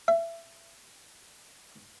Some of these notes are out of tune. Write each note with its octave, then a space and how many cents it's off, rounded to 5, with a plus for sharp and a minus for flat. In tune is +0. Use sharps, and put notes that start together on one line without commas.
E5 +25